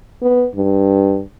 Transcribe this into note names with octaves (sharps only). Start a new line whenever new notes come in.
B3
G2